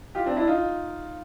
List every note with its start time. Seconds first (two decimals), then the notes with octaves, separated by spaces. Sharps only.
0.15 F4 G4
0.26 C4 D4
0.36 D4 E4
0.47 D#4 F4